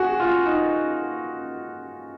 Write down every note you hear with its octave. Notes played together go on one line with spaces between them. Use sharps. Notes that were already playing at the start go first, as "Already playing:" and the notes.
Already playing: F#4 G#4
F4
D#4